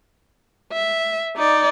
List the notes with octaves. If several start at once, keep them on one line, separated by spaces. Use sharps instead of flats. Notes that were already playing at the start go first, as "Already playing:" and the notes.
E5
D#4 D5